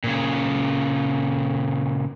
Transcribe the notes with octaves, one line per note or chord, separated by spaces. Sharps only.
A#2 C#3